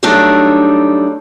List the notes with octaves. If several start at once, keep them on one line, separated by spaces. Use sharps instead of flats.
F#3 G3 A3 D4 D#4